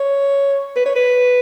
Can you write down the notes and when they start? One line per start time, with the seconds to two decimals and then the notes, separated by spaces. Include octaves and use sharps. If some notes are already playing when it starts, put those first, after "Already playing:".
Already playing: C#5
0.76 B4
0.86 C#5
0.96 B4